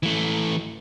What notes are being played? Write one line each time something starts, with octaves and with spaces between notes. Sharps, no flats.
E3 A3